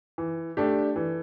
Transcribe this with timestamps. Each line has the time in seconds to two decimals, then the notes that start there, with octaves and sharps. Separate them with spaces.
0.18 E3
0.57 A3 D4 G4
0.96 E3